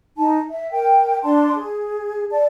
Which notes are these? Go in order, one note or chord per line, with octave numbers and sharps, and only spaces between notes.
D#4 A5
E5
A#4 G5
D4 D5 A5 C6
G#4
D5 A5